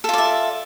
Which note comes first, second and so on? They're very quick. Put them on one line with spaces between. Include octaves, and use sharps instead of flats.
A4 F4 D5 E5